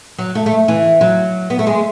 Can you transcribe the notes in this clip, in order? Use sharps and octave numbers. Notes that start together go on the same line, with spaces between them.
F#3
A3
A3
E3
F#3
B3
A3
G#3